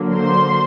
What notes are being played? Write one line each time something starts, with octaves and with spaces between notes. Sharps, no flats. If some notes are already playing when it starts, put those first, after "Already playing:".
Already playing: D3 F#3 A#3
C5 C6